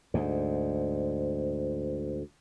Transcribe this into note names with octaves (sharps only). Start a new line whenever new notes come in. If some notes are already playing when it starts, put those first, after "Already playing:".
D2 G#2